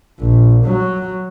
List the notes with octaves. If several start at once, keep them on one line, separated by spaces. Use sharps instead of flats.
A#1
F#3